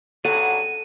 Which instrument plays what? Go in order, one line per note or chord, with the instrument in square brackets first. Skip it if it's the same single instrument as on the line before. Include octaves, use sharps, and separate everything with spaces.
[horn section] G2 C#3 F#3 [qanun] A4 [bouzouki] F#5 [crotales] D#7